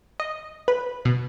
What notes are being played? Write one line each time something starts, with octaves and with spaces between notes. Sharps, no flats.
D#5
B4
B2